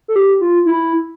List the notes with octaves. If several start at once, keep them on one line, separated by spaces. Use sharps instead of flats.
A4
G4
F4
E4